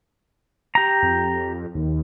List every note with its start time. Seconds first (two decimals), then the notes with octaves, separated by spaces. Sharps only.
0.75 G4 A#5
1.03 F2
1.75 D#2